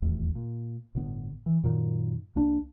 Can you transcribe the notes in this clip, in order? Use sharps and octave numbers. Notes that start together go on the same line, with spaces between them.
D#1 G#1 E2 A2
A#2
G1 A2 D3 B3
E3
F#2 A#2 D#3
C2 A#3 D4